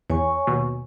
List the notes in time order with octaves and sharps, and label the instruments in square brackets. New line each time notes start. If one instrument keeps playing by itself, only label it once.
[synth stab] E2 [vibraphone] C#5 G#5 C#6
[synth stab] D#2 B2